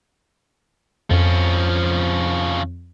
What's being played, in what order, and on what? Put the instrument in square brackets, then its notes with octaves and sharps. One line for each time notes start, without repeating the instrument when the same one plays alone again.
[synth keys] F2 [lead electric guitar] F3 C#4